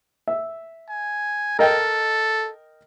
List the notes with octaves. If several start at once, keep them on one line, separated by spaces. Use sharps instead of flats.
E5
G#5
A4 A#4 D#5 G5